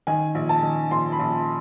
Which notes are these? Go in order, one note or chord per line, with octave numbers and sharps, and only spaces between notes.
D#3 G#5
A#1
A5
D#3
A#1 C6
B5
A#1